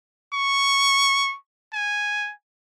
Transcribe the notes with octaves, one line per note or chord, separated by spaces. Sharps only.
C#6
G#5